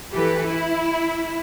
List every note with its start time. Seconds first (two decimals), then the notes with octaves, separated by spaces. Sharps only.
0.13 E3 G4 A4 B4
0.45 E4